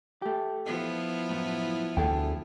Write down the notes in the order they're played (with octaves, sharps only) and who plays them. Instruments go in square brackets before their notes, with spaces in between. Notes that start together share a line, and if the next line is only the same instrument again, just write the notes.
[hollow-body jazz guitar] A3 G4
[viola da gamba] F3 B3 E4
[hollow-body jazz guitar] F#2 A2
[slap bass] D2 [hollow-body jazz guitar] G#4 A4 G5